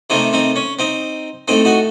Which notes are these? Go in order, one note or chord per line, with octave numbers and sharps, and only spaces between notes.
C3 D#3 A3 C4 D#4
C4 D#4
C#4
C4 D#4
A2 A3 C4 D#4
D#4 F#4